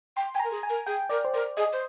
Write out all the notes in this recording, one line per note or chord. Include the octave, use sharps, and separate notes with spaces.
G5 C6
G5 G#5
A#4 A#5
G#4
G#5
A#4
G#4 G5
A#4 D5
C5
A#4 D5
G#4 D#5
C5